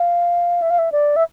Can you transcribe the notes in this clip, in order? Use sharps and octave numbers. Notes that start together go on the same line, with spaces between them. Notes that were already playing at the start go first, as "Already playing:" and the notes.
Already playing: F5
E5
F5
E5
D5
E5